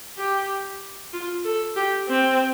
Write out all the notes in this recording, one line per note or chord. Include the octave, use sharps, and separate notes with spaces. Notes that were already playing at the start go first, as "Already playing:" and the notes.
G4
F4
A4
G4
C4